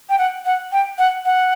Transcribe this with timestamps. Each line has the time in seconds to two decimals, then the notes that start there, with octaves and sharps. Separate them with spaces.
0.09 G5
0.18 F#5
0.45 F#5
0.72 G5
0.98 F#5
1.25 F#5